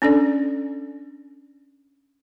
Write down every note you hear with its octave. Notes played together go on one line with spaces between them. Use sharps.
C#4 D4 A4 D5